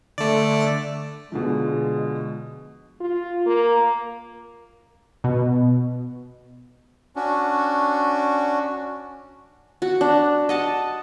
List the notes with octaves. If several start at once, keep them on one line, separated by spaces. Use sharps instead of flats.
D3 A3 D5
B2 D3 F3 G#3
F4
A#3
B2
C#4 D4 F#4
F#4
D4
D#5 F#5 A5